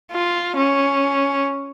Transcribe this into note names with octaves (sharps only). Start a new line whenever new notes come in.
F4
C#4